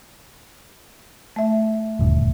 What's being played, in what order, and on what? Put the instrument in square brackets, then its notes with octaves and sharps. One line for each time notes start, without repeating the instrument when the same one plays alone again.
[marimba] A3 E5
[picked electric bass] D#1 D2 G2